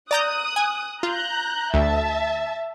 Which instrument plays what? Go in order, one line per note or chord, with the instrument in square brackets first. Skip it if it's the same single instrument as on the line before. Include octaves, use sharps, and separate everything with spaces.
[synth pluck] D5 A#5 G6 [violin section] D#6 F#6
[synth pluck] G#5
[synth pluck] F4 [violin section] A#5 F#6 G6
[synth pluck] D2 [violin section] E5 A5